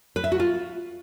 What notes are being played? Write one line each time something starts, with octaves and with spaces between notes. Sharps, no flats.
B4
E5
F#4
F4